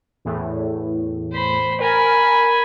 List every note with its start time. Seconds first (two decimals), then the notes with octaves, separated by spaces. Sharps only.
0.25 E2 A2
1.33 C5 B5
1.80 A#4 G#5 B5